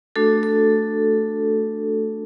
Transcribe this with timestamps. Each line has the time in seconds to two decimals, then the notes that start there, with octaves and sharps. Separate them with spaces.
0.16 A3 D4 F#4 A4
0.43 A4